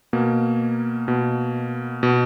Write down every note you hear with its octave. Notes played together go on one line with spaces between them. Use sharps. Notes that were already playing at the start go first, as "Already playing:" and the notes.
B2 A#3
B2
B2